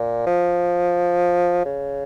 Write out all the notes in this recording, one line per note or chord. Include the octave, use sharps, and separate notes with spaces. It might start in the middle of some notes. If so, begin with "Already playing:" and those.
Already playing: A#2
F3
C#3